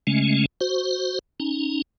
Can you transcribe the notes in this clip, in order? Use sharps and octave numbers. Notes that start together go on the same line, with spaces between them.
C#3 G#3 A3 C#4
F#4 C5
C#4 D#4